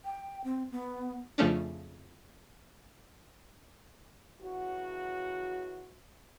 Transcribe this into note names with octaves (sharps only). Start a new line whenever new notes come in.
G5
C4
B3
F2 C#3 F3 A3 C#4 D4
C#3 E3 F#3 F#4